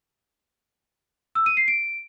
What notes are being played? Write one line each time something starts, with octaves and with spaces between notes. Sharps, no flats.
E6
D#7
C7
D7